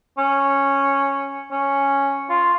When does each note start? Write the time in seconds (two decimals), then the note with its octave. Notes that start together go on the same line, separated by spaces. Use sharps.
0.18 C#4
1.51 C#4
2.29 F4